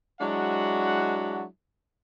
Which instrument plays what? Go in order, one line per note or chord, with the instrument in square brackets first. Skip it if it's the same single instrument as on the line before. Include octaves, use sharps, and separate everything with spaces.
[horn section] F#3 G#3 D4 E4 F#4 F#5